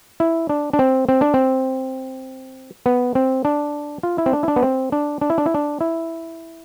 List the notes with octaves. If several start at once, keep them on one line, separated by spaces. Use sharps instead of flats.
E4
D4
D4
C4
C4
D4
C4
B3
C4
D4
F4
E4
C4
D4
E4
D4
B3
C4
D4
D4
E4
D4
E4
D4
E4